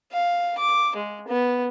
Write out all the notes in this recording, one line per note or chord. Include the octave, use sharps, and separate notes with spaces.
F5
D6
G#3
B3